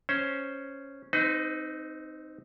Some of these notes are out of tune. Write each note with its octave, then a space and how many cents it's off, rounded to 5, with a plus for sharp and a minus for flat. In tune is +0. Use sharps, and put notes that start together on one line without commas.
C#4 +0 C5 +0
C4 +0 D#4 +0 B4 +40